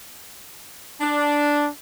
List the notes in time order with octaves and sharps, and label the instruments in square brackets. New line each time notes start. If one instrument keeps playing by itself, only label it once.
[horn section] D4